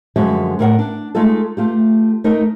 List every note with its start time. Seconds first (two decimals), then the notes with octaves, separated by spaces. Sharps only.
0.16 F#2 D3 F3 G#3 F#4 E5
0.59 A2 A#4 F5 F#5
0.79 D4
1.15 G#3 A3 D#4 F4 A4
1.57 A3 F4 G4
2.24 A3 D#4 A#4 D#5